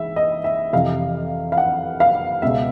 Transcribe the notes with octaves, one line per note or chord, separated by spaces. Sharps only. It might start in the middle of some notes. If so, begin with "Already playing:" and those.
Already playing: G#2 E3 E5
D#5
E5
F2 C3 E3 F5
F5
F#5
F5
C#2 B2 E5